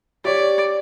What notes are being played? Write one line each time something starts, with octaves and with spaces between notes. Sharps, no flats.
G4 C#5 D5